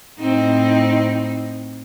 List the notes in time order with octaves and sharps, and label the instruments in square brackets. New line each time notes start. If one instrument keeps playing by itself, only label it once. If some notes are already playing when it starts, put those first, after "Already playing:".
[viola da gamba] A2 C4 D#4